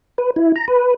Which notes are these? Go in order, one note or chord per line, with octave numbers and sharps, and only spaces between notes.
B4
E4
A#5
B4